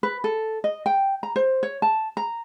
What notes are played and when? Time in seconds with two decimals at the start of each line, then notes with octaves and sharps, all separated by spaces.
0.03 B4
0.24 A4
0.64 D#5
0.86 G5
1.23 A#5
1.36 C5
1.63 C#5
1.82 A5
2.17 A#5